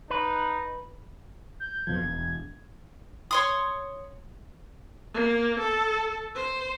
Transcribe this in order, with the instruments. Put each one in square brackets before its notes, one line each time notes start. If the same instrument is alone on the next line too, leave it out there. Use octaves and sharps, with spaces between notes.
[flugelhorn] D#4 [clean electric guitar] B4
[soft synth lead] G6
[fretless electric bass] F2 B2 F3 [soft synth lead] G#6
[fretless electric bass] E1
[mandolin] C#5 C6 D#6
[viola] A#3
A4
C5